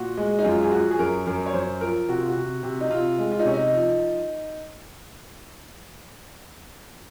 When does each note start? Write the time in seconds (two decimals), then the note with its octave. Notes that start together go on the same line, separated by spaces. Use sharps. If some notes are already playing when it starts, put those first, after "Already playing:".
Already playing: A#2 F#4
0.17 G#3
0.39 D#4
0.44 F#2 F4
0.63 G#4
0.71 F3 F#4
0.91 G#4
0.99 F#2 A#4
1.27 F#2 A#4
1.46 C#5
1.54 F#2 C5
1.81 F3 A#4
2.09 C3 F#4
2.19 F4
2.29 F#4
2.37 C3
2.63 C3
2.81 D#4
2.90 C3 F4
3.18 G#3
3.32 F4
3.39 D#4
3.45 C3 C#4
3.54 D#4
3.73 F3